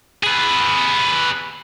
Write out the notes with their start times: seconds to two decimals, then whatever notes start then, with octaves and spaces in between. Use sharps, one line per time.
0.23 G#4 B4